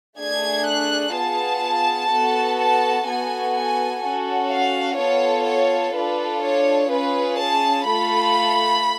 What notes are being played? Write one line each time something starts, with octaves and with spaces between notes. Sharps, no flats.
A3 D4 G#4 G#6
F#6
B3 F4 G#4 A5
B3 F#4 A4
A5
B3 F#4 A4 G#5
G#5
C#4 F#4 A4
F5
B3 F4 A4 C#5
C#5
D4 F4 A4 B4
C#5
C#4 F4 G#4 B4
A5
A3 F4 A4 B5